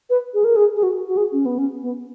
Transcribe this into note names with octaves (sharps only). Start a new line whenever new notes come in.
B4
G#4
A#4
G#4
G#4
F#4
F#4
G#4
C#4
B3
C#4
B3